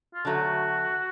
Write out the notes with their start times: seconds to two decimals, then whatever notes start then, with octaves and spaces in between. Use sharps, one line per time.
0.14 F4
0.25 D3 F#3 A3 F#4